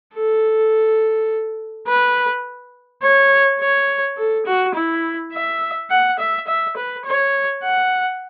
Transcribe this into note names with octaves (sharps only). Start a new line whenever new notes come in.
A4
B4
C#5
C#5
A4
F#4
E4
E5
F#5
E5
E5
B4
C#5
F#5